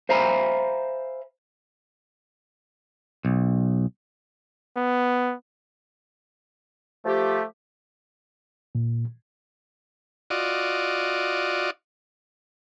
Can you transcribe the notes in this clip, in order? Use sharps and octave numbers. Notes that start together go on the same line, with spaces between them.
C5 E5 F5 G#5 A#5 B5
B1
B3
F3 A3 G4
A#2
F4 F#4 D5 D#5